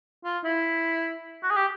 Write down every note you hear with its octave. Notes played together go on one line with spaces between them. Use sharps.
F4
E4
F#4
G#4
G4